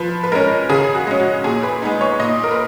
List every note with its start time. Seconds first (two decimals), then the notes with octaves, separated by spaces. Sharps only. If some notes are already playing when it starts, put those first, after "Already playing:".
Already playing: F3 B4
0.24 B4
0.32 G#3 C#4 A#4
0.69 C#3 G#4
0.95 F#4
1.07 G#3 C#4
1.20 F#4
1.44 A#2 G#4
1.63 B4
1.82 G#3 B3 D#4
2.01 C#5
2.20 A#2 D#5
2.44 A#4
2.51 B4